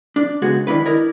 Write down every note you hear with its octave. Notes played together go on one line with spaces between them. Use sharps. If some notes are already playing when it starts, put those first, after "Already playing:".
D4
C#3 G#3 B3 F#4 G#4
D#3 D4 E4 B4
E4 A#4 D5 D#5